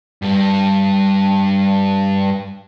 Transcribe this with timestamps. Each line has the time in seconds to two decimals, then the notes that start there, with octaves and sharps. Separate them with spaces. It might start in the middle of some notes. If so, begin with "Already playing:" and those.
0.22 G2 G3